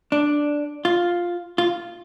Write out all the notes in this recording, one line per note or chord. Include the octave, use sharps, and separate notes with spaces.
D4
F4
F4